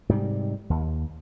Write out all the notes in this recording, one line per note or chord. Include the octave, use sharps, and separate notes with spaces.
G#2 C3 G3
D#2